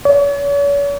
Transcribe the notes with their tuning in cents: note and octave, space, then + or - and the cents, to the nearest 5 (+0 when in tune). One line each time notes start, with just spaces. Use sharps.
C#5 +40